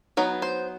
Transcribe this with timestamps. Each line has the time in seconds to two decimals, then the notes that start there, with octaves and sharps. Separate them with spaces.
0.17 F#3 B3 D#4 B4
0.42 C5